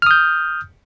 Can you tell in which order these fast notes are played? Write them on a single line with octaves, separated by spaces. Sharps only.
F6 D#6 G6